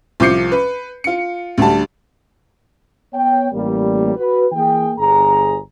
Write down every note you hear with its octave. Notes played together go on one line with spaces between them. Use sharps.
C2 F3 D6 G6 C7 C#7
B4
F4 C#7
D2 D3 G3 A5
B3 C#5 G5
A1 G3 A#3
F#4 B4
E3 A#3 G#4 G5
G1 G#4 A#5